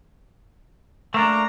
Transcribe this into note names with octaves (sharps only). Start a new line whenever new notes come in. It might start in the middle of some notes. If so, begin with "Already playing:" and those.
A3 A#3 D4 A#5